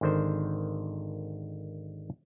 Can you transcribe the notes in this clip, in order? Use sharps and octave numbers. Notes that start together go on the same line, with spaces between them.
G#1 D3 D#3 C5